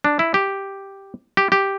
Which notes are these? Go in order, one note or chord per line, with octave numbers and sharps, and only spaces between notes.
D4
E4
G4
G4
G4